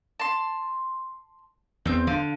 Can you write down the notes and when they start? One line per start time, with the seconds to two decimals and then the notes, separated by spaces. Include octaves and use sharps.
0.19 A5 C6
1.86 E2 C4 G6
2.07 D3 F5